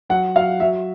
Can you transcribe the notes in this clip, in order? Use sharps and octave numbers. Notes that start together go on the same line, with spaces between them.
F#3 F#5
F#3 F5
F#3 E5